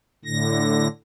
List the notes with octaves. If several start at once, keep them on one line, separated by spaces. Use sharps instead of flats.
A2 D3 A#6